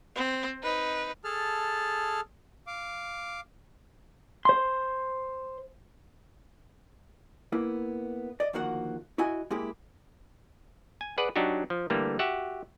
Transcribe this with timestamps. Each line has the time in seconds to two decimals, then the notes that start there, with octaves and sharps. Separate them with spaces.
0.15 C4
0.64 D#4 B4
1.24 G#4 A4 A5 F6
2.67 F5 D6
4.45 C5 C6
7.52 A#3 B3 E4
8.40 D5 D#5
8.53 D2 D#3 F3 A#3 F#4 F#5
9.18 E4 F#4 D#5 G#5
9.50 G#3 A#3 E4 G4 G#4
11.01 G#5
11.18 G#4 B4 D5 F#5
11.36 F#3 D4 D#4 F#4 G4
11.70 F3
11.90 D3 E3 G3 A3 A#3
12.19 F#4 G4 E5 F#5